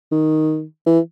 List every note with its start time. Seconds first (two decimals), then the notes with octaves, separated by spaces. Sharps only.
0.12 D#3
0.86 E3